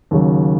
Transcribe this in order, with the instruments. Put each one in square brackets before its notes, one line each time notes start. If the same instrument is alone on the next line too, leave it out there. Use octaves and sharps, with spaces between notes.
[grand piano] D#2 C#3 F#3